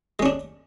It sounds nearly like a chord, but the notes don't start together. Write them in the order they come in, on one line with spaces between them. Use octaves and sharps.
G#3 C#4 D4